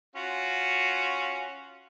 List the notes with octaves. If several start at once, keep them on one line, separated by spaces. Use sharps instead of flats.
C#4 F4 F#4